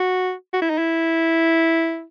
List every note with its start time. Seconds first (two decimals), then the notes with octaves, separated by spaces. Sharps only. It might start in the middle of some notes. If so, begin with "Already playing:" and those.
Already playing: F#4
0.53 F#4
0.62 E4
0.70 D#4
0.78 E4